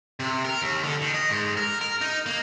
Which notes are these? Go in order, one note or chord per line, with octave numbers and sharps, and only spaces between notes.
C3
A#4
D#2
D3
D#3
D#5
G#2
A#4
A#4
D#4
A#3